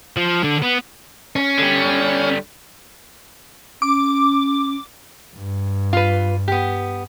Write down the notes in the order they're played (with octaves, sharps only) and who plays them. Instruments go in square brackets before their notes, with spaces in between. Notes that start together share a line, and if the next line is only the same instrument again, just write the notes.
[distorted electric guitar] F3
D3
B3
[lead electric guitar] C#4
[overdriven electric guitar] D3 G3
[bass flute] C#4 [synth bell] D6
[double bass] G2
[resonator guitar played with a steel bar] F4 B4
B3 G4